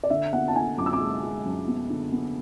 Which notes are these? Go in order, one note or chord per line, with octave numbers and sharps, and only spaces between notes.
D5
D3 E5
B3 F#5
A5
D3 G#5
F#2 D6
E6
D6
G#3
G#3
F#2
B3
D3
B3